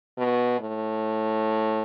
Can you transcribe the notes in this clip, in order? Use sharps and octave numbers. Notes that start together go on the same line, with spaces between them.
B2
A2